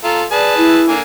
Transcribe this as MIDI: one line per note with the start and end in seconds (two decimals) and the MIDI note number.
0.04 0.24 65
0.04 0.24 69
0.04 0.21 82
0.32 0.82 68
0.32 0.82 71
0.32 0.54 74
0.32 0.82 81
0.57 0.94 64
0.88 1.01 50
0.88 1.01 58
0.88 1.01 80